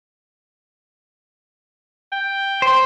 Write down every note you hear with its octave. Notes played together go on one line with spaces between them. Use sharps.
G5
C5